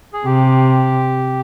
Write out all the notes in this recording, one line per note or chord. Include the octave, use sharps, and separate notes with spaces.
G#4
C3 G4